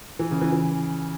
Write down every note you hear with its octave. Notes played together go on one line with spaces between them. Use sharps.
E3
C#3
E3
E3